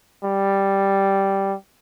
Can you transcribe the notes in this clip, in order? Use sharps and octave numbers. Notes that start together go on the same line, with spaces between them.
G3